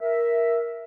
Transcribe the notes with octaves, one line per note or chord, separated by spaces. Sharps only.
A#4 E5